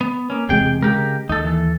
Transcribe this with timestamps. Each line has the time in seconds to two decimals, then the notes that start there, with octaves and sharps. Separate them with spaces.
0.01 B3
0.30 A#3 C#4
0.49 E1 C3 G#3 G#4 G5
0.82 C#3 G#3 G4 A#4
1.29 D#2 D#4 A4
1.44 E3 A4